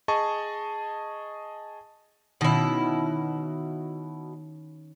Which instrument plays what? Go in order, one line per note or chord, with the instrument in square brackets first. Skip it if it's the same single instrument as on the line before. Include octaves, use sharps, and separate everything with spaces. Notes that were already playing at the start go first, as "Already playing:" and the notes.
[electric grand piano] G#4 D#5 A5 C#6
[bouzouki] B2 E4 [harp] D#3 C#4